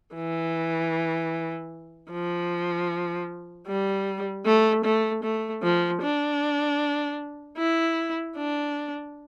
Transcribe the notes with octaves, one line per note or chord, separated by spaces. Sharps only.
E3
F3
G3
A3
A3
A3
F3
D4
E4
D4